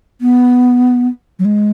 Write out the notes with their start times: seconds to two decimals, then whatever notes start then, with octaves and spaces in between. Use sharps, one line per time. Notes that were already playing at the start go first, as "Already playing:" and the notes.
0.21 B3
1.39 F#3
1.45 G#3